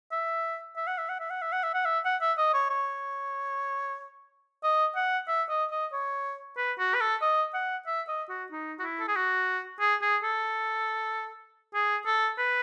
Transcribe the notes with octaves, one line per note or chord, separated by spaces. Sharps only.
E5
E5
F#5
E5
F#5
E5
F#5
E5
F#5
E5
F#5
E5
F#5
E5
D#5
C#5
C#5
D#5
F#5
E5
D#5
D#5
C#5
B4
F#4
B4
A4
D#5
F#5
E5
D#5
F#4
D#4
F#4
E4
A4
G#4
F#4
G#4
G#4
A4
G#4
A4
B4